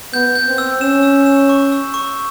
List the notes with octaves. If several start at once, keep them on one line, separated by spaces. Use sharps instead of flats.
B3 G6
G6
C4
E6
C#4 E7
E6
E7
C#6
E6
C#6